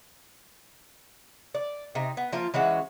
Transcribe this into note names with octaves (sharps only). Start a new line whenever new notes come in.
D5
C3 D#4
B3
F3 A#3 F4
E3 G#3 C#4 F#4